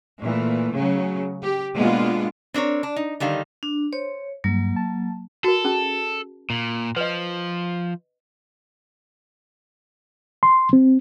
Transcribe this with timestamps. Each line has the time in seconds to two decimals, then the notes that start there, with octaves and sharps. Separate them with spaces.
0.21 A#2 E3 A3
0.74 C#3 F#3
1.42 G4
1.75 B2 G#3 A#3 B3 D4 F4
2.54 C4 D4 A#4 C#5
2.83 D4
2.96 D#4
3.20 D3 D#3 G3 F5
3.63 D4
3.93 C5 C#5
4.44 G2 F#3 A#3
4.76 A5
5.44 F#4 A4 A#4
5.65 C#4 G#4 A5
6.50 A#2
6.96 F3 B4 D#5
10.43 C6
10.73 C4